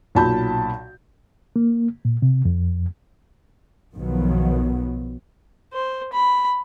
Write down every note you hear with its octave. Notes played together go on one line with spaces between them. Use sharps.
B1 A#2 A5 B5 G6
A#3
A#2
C3
F2
B1 B2 D#3 F3 F#3 B3
C5
B5